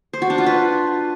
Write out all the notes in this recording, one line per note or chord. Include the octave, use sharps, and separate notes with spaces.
C5
F#4
D4
F4
B4